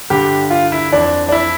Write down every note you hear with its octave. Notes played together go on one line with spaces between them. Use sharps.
G2 D3 G4
F4
E4
F2 E3 D4
D4
E4